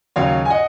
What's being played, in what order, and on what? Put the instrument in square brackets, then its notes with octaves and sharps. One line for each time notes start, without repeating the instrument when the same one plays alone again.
[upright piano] D#2 C#3 F#3 C#5 F5
G#5
D#5 F#5